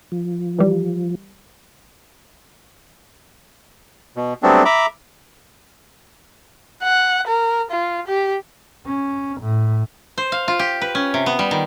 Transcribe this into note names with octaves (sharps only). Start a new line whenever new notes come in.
F3
E3 G3
B2
F#3 G3 A3 B3 C4 D4
E5 A#5 B5 D6
F#5
A#4
F4
G4
C#4
A2
C5
F5
F4
G4
B4
C#4
C3
B3
G3
D#3